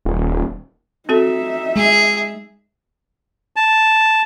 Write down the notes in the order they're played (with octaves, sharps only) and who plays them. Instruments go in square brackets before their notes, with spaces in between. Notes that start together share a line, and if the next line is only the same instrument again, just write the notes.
[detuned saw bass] D#1
[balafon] C4 F#4 A4 [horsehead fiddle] D#4 E5
[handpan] G#3 [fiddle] G#4
[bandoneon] A5